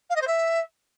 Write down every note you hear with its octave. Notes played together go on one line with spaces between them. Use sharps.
F5
D#5
C5
E5